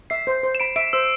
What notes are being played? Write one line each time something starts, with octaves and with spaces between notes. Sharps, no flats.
E5 C7
C5
C5
E7
B5 D7
E5 D7
C5 E6